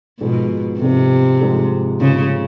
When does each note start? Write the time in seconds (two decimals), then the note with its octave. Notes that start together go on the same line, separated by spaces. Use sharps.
0.20 G#2 B2 F3 G#3
0.80 G#2 C3 F3 G#3
1.40 G#2 F3 G#3
2.00 G#2 C#3 F3 G#3